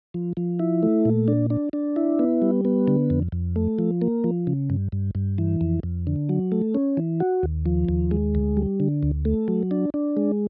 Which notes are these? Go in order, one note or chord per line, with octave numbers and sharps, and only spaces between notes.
F3
F3
E4
A3
A#2
D4
D4
D4
E4
B3
G3
B3
D3
F2
F2
A3
F3
A#3
F3
C#3
G2
G2
G2
E3
F2
F2
D3
F#3
A3
C#4
E3
F#4
D#2
F3
D#2
G#3
D2
G3
D3
D2
A3
F#3
D4
D4
G#3